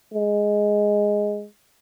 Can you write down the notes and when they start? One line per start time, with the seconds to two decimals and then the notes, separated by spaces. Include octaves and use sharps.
0.14 G#3